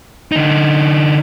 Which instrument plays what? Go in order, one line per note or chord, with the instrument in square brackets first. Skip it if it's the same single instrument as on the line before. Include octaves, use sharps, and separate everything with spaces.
[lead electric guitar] D3 D#4